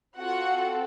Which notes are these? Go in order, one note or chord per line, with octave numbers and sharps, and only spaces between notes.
C4 F4 F#4 A4 F#5